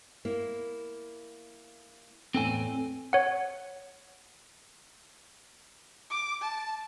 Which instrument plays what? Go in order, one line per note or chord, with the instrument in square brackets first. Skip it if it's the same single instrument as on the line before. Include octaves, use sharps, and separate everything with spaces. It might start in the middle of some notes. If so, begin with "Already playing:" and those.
[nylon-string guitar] A#3 E4
[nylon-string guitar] E2 A2 [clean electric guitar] C4 A4 G#5
[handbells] C#5 F#5
[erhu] D6
A5